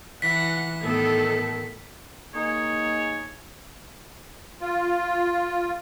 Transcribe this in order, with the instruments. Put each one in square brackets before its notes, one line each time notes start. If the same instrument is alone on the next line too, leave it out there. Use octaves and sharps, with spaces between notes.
[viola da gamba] E3 [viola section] F#5 [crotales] B6
[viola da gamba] A2 B3 [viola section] D#3 A4
[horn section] A#3 D#4 G#4 [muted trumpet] C#5
[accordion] F4